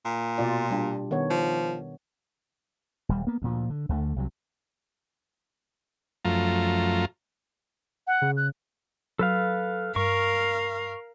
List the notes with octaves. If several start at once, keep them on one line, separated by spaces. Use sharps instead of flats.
A#2
B2 F4 D5
G3 D4
D#3 B3 C#5
F3
D#1 G3
A#3 B3
D2 A#2 F3
D3
D2 D3 F3 A3
C2 C3 F#3
F#2 F3 A3 F4 A#5
F#5
C#3
F#6
F#3 A4 B4 F5
G2 A#4 F5 C#6